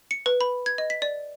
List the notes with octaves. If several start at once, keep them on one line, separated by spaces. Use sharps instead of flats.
C#7
B4
B5
G#6
D#5
B6
D5